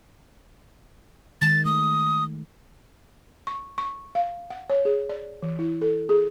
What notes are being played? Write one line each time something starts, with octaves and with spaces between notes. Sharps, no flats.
D#3 G#3 A6
A3 D#6
C#6
C#6
F5
F#5
C#5
G#4
D5
E3
E4
A4
G#4